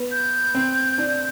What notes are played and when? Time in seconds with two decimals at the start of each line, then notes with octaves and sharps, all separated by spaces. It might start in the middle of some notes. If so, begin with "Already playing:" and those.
Already playing: B3
0.11 G6
0.55 C4
0.98 D4